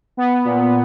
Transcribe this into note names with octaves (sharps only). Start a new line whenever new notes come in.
B3
A#2